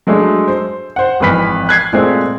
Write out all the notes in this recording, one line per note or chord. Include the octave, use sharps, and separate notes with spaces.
F#3 G#3 A3 D4
C5
C5 F#5
G#1 F2 E3 B4 F6 B6
F#6 G#6 C7
A#2 G#3 A3 C4